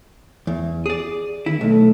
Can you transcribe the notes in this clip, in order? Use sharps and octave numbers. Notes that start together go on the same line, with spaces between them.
E2
G#4 D5
D#3 E4
B1 A3